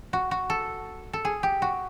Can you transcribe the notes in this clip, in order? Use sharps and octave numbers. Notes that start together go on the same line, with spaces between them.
F#4
F#4
A4
A4
G#4
G4
F#4